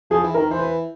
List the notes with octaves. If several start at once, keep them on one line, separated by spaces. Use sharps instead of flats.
F3 G#4
E3
D#3 A#4
E3 C5
B4